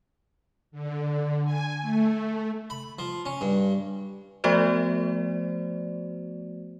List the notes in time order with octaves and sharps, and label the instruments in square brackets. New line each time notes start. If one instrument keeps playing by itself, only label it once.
[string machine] D3
G#5
A3
[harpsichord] B5
F3
C#4
G2
[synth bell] F3 A3 B3 F#4 C5 D5